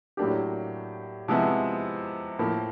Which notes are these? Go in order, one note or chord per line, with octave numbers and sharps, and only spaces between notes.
A2 F#3 A#3 D4 G4
C3 F3 G#3 B3 E4
A2 F3 A#3